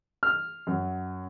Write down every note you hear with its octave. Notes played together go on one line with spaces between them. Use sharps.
F6
F#2